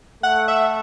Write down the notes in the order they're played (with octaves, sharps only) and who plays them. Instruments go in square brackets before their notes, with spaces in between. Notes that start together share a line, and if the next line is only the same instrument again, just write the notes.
[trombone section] A3 [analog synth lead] F#5
[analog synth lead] E5